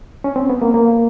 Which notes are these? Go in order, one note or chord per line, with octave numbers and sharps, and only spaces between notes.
C#4
C4
B3
A#3
A#3